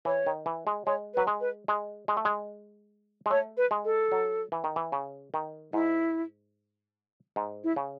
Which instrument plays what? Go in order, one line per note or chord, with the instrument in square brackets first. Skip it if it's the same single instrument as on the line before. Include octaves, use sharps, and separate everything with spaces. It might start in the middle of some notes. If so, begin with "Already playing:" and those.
[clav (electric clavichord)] E3 [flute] C#5
[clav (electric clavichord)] D#3
E3
G#3
[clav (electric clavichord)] G#3 [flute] C#5
[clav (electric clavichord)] F#3 [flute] B4
[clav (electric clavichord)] G#3
[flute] B4
[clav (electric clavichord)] G#3
G#3
A3
G#3
G#3
[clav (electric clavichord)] A3 [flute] C#5
[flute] B4
[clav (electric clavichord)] G#3
[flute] A4
[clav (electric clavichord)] F#3
E3
D#3
E3
C#3
D#3
[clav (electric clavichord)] G#2 [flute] E4
[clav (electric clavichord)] G#2
[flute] E4
[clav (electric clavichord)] C#3